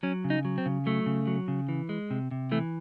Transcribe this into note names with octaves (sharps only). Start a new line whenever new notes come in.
F#3 C#4
C#3
D#4
F#3
C4
C#3
F#3 A3
C#3
F#3
C#3
E3
G#3
C3
C3
E3 A3